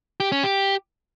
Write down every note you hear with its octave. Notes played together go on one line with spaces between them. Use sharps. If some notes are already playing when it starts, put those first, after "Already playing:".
G4
C#4
G4